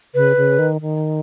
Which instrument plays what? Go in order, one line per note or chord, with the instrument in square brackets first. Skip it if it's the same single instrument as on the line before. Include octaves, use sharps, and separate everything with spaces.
[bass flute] C#3 [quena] B4
[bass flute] C#3
D#3
D#3